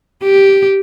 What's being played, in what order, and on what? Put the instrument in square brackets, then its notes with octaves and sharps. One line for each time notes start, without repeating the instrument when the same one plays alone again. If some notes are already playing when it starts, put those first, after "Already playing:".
[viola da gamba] G4